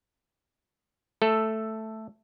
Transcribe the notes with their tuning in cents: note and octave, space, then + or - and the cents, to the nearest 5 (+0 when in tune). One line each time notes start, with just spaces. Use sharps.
A3 +0 A4 +0